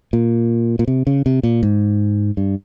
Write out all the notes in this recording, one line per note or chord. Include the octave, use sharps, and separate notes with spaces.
A#2
A#2
C3
C#3
C3
A#2
G#2
G2